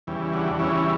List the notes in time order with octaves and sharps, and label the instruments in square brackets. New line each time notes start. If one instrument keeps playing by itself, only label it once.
[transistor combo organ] E2 C#3 E3 G3
D4 F#4
F#4
E2 C#3 E3 G3 C#4 E4